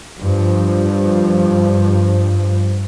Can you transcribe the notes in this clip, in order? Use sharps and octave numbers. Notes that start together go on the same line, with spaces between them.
G2 F3